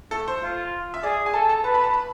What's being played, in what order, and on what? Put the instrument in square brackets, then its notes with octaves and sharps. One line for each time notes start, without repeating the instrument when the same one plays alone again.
[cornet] A3 [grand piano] A4
[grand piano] C5
[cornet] F4
[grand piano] E5
[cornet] G#4 [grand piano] D5
[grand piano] G#5
[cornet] A4 [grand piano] A5
[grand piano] A5
[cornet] B4 [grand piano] A5
[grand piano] B5
A5
B5